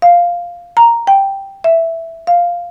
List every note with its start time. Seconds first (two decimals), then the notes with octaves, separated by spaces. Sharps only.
0.02 F5
0.77 A#5
1.07 G5
1.64 E5
2.27 F5